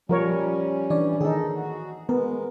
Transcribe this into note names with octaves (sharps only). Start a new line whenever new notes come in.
F3 G3 C#4 A#4 C#5
E3 D4 C#5 D5
D#3 D#4 G#4 A4
F#4
G#3 B3 A#4